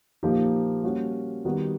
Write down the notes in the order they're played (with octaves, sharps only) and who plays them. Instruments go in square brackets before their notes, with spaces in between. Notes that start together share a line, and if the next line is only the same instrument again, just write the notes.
[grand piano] A#2 F3 A#3 D#4 G4
G3 A#3 C#4 F#4
D#3 G3 B3 D#4 F#4